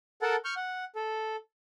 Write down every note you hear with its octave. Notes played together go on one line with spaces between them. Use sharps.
A4 A#4 F#5 A5
C#6 F6 G6
F#5
A4